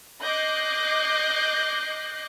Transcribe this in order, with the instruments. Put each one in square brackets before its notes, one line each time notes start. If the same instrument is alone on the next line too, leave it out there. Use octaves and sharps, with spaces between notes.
[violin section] D#5 D6 F#6 G6 A#6 C7